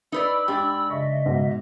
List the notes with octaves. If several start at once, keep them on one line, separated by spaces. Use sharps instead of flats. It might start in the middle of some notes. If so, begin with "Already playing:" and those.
D#4 B4 D5 B5 E6
G#2 D4 G4
C#3 D#5 E5 C#6
G#2 B2